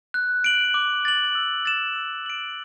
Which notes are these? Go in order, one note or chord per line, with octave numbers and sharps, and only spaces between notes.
F#6
D7 F#7
D6
A6 F#7
E6
A6 E7
E6
D7 F#7